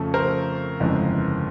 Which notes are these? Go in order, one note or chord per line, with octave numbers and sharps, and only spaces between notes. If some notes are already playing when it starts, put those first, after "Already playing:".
Already playing: F2 C#3 F3 A3 C#4 A4
A#4 C5
G1 F2 C#3 E3 G#3